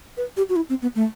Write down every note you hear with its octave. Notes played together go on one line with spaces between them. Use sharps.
B4
G4
F#4
E4
C4
B3
A3